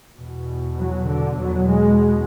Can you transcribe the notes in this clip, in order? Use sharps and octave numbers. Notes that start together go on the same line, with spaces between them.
E2 B2
F#3
D3
E2 B2 F#3
G#3